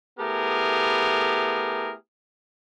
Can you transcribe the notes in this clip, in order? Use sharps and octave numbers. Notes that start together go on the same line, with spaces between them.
A3 B3 E4 G4 G#4 A#4